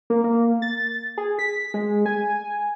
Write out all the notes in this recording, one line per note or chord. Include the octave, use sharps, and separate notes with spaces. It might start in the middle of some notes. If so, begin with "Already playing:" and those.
A#3
A#3
A6
G#4
B6
G#3
G#5